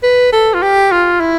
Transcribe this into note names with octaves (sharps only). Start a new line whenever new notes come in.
B4
A4
F4
G4
F4
E4